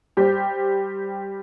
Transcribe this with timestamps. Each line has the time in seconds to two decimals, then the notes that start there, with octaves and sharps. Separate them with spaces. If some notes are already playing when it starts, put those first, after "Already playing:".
0.17 G3 G4 C5